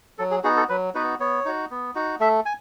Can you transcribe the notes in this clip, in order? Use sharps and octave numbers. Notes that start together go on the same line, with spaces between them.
F#3 A4
G#4
B3 D#4 F#4 G#4
A4
F#3 B4
B3 D#4 F#4 B4
B3 C#5
D#4 F#4
B3
D#4 F#4
A3 E5
G#5